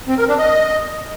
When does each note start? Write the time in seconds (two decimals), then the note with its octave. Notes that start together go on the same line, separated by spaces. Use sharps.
0.08 C4
0.18 A#4
0.28 D4
0.38 D#5